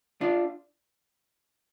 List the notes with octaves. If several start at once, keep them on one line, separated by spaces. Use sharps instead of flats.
D4 F4